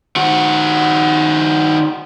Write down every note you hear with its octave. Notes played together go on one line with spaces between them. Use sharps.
D#3 F#4